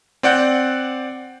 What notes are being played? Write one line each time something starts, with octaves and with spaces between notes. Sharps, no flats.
C4 D5 F#5 G6